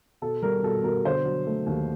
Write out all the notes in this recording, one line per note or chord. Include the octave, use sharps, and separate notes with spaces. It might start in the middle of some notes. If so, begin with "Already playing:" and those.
B2 A4
G3 A#4
B2 A4
B2 A#4
D3 C5
F#3
A3
D#2